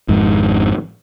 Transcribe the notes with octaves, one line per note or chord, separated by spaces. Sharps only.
G#1 F2 G#2